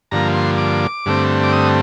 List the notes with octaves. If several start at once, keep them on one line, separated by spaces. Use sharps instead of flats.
G2 D3 F3 A#3 A#5
C6
D6
G2 D3 A3 C4
D6
D#6